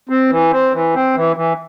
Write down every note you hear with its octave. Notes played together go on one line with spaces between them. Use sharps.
C4
E3
C4
E3
C4
E3
E3